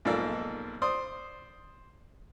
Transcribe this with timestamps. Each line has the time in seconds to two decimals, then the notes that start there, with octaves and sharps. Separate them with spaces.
0.05 B1 G#2 F3 A#3 A4 D5
0.82 C5 D5 C6 D#6